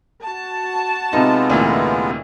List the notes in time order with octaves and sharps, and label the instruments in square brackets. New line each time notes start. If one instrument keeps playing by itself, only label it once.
[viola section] F#4 A5
[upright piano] C3 D#4 [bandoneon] G#3 B3 F4
[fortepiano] D2 A#2 E3